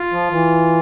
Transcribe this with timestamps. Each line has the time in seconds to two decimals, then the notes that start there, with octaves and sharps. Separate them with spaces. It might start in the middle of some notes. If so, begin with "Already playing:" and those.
Already playing: F4
0.12 F3
0.31 E3